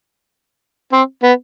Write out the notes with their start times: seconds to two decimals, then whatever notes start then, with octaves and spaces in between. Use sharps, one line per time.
0.92 C4
1.23 B3